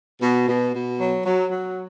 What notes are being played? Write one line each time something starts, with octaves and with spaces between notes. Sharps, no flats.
B2
B2
B2
F#3
F#3
F#3